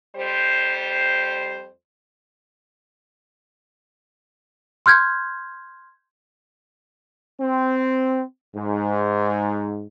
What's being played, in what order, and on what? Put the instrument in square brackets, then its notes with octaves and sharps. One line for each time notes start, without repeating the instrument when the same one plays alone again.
[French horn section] F2 G3 C5
[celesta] C6 F6 G6 G#6
[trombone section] C4
G#2